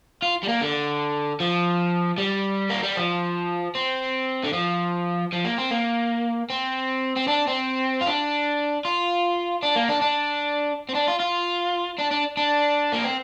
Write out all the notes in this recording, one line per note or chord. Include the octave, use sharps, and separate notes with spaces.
F4
G3
A#3
D3
F3
G3
A#3
G3
F3
C4
D3
F3
F3
A#3
C4
A#3
C4
C4
D4
C4
F4
D4
F4
D4
A#3
D4
D4
C4
D4
F4
F4
D4
D4
D4
A#3
C4